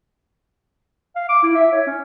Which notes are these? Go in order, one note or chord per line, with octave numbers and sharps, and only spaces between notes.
F5
D6
E4
E5
C#5
C#4